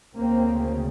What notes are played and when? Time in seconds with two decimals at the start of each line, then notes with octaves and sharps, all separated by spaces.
0.17 D2 C#3 A#3 C4